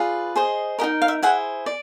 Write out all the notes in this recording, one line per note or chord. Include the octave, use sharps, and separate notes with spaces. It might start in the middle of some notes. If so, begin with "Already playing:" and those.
Already playing: F4 G#4 B4 D5
G#4 C5 D#5
D#4 G4 A#4 D#5
F5
E5
E4 G#4 C5 F#5
D5